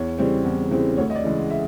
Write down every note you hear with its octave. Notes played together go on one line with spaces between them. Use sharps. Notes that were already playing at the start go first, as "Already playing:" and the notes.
Already playing: E2 C#5
C#3 E3 G3 C4
E2
C#3 E3 G3 C4
D2 C#5
D#5
D5
C#3 E3 G#3
E5